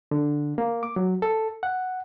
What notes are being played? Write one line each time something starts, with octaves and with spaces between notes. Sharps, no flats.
D3
A#3
D6
F#3
A4
F#5